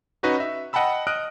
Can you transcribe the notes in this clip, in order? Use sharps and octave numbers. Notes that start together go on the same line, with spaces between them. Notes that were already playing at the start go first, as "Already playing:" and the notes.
C#4 D#4 F#4 B4 C#5 D#5
E5
D#5 F#5 G5 A5 B5 E6
D#5 D#6 F6 F#6 D7